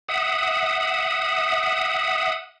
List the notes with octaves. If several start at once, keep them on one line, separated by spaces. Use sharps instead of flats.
E5 F#5 D#6